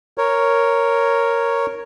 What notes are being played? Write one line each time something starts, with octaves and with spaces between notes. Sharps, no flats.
A#4 C#5